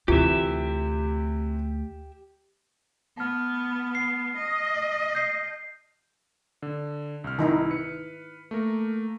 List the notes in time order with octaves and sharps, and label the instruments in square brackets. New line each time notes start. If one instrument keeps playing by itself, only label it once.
[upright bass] D2 [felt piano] C3 E3 [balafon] F4 [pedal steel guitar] G4 E5
[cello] B3 [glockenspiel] A5 F6
[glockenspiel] C7
[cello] D#5
[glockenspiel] G6 C7
[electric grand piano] D3
C2 F6
[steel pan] D#3 D#4 E4
[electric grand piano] B4 C#7
A3 A#3 A#4